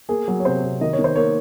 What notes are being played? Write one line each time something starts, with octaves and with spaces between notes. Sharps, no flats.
A#3 G#4
F#3
C#5
C3 C5
C3
D#3 D#5
C#5
D#3
C5
A#3 C#5